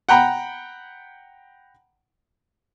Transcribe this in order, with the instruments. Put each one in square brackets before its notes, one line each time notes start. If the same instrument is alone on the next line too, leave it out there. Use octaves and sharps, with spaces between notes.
[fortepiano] F#5 G5 A#5 B5